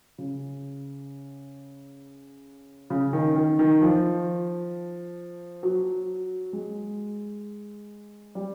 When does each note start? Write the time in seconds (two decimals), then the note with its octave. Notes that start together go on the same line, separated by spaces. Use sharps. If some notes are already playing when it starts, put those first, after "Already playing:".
0.18 C#3
2.90 C#3
3.13 D#3
3.36 D#3
3.59 D#3
3.81 F3
5.63 F#3
6.53 G#3
8.35 G3